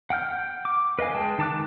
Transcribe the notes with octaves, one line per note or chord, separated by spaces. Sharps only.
F#5 G5 F6 G6
D6
B4 D#5 F5 G#5
G#3 G5 A5
D#3 A5 D6 F#6